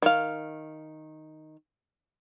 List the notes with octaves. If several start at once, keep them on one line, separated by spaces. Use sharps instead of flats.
D#3 F5